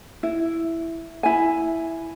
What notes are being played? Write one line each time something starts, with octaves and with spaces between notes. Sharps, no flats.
E4
E4 G#5